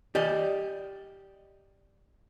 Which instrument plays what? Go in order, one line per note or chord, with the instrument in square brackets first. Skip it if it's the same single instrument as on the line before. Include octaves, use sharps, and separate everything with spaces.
[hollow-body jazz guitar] G4 D5 D#5